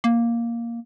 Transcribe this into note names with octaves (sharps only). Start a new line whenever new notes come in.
A#3